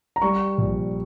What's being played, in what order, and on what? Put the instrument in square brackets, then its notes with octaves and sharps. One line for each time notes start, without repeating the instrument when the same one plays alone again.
[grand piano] A#5
G3 C#6
A#1